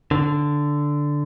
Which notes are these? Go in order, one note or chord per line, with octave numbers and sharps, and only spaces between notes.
D3